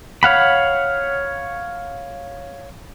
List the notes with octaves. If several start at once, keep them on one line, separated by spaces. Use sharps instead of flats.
C#5 F5 F#5 B5